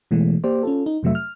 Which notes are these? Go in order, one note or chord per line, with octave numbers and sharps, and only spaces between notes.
B2 E3 G#3 A3
A#3 G4 C5 D5
C#4 F4 A4
D#4
F2 C3 F#3 A3 E5
F6